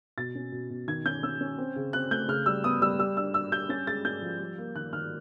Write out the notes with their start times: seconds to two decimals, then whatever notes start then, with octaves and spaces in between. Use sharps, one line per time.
0.17 B2 A6
0.35 C#4
0.52 B2
0.70 B2
0.88 D#3 G#6
1.05 C#4 G6
1.23 C#4 E6
1.41 C#4
1.58 C4
1.76 C#3
1.93 C4 F#6
2.11 A3 G6
2.28 C#3 F6
2.46 G3 E6
2.64 B3 D#6
2.82 G3 E6
2.99 G3 E6
3.17 D4 E6
3.34 D4 E6
3.52 G3 G6
3.69 C#4 A6
3.87 G#3 A6
4.05 C#4 G6
4.22 F3
4.40 G3
4.58 A#3
4.75 D#3 F#6
4.93 D#3 F6